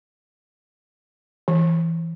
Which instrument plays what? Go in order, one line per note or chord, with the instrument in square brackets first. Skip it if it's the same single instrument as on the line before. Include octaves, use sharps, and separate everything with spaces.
[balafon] E3